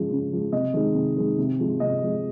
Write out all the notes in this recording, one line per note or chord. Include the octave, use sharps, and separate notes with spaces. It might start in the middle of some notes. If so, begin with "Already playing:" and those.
Already playing: C#3 F3 G#3
C#3
F3 G#3
C3 D#5
D#3 G#3
C3
D#3 G#3
C3
F3 G#3
C3 D#5
F3 G#3